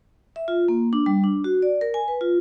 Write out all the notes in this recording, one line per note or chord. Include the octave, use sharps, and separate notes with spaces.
E5
F4
A#3
D4
G3
D4
F#4
D5
A#4
G#5
B4
F4